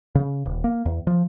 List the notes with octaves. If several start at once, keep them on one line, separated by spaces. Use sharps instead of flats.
C#3
D#1
A#3
E2
F3